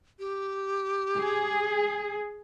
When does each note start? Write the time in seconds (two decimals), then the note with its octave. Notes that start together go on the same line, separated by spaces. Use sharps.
0.19 G4
1.17 G#4